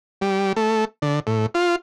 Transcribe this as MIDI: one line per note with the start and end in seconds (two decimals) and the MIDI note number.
0.21 0.53 55
0.56 0.85 57
1.02 1.20 50
1.27 1.46 45
1.54 1.76 65